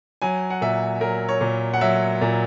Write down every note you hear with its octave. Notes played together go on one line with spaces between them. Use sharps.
F#3 G#5
F#5
A#2 E5
F#3 A#4
C#5
A#2
F#5
F#3 E5
A#2